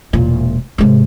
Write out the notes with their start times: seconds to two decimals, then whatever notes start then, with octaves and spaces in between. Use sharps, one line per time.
0.13 E1 A#2
0.78 G#2 C3